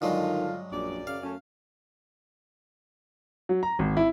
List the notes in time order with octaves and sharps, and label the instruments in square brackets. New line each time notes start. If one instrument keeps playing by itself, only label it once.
[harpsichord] G2 F#3 G#3 [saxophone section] D3 F4 [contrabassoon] D#3
[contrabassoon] A#1 [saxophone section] F#2 D5
[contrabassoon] C#3 [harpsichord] F5
[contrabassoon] F#2 [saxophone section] A3 C#4
[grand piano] F#3
A#5
G#1
E4